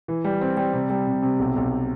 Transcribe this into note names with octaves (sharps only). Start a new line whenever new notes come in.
E3
G3
C4
G3
C3
G3
C3
C3
B1
B1